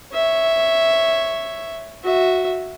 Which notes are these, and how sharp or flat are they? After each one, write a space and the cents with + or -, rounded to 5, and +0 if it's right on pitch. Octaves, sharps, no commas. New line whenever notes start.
C#5 +0 E5 +0
F#4 -5 E5 +0